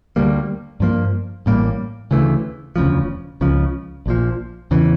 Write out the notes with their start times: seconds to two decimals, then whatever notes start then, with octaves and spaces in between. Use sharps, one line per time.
0.16 D2 D3 G3 A#3
0.80 G2 F3 A#3
1.46 A1 A2 G3 A#3
2.11 D2 C#3 E3 A3
2.76 E1 D2 C#3 F3
3.41 C#2 C#3 F3
4.06 A#1 A#2 F3
4.71 E2 C#3 E3